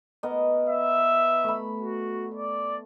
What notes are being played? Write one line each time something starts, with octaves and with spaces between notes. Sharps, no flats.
B3 A#4 D#5
E5
A3 B5
F#4
D5